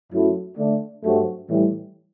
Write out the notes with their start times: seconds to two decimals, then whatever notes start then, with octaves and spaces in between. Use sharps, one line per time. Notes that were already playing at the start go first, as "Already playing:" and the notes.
0.12 F#2 F#3 A3 E4
0.57 D3 A3 D4
1.03 G2 F#3 A3 C4 F#4
1.48 A2 E3 G3